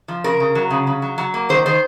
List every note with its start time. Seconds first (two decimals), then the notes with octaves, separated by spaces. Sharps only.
0.08 F3
0.24 C#3 A#4
0.40 C#3
0.55 F#3
0.71 C#3
0.87 C#3
1.02 F#3
1.18 F#3
1.34 A#3
1.49 D#3 C5
1.66 D#3 C5